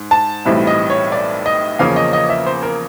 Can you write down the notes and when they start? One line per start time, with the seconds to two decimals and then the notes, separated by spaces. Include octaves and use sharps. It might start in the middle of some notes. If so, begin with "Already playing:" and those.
Already playing: G#2
0.11 A5
0.45 B1 A2 E3 G3 C4
0.67 D#5
0.90 C#5
1.12 D5
1.46 D#5
1.79 E2 C#3 F3 A#3 C#4 F5
1.96 D#5
2.13 D#5
2.30 E5
2.46 C5
2.63 A#4